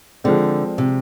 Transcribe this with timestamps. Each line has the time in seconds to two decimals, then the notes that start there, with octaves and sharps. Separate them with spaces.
0.24 D3 F3 G#3 C4
0.78 C3